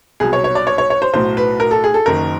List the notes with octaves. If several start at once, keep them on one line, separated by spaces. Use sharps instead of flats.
C2 B2 F#3 G#4
C#5
C#5
D5
C#5
C#5
C#5
C5
B1 A2 F#3 C5
B4
A#4
A4
G#4
A4
F#1 F#2 D#3 A#4